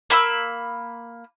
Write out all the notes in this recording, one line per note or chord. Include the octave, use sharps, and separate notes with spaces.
A#3 B5 E6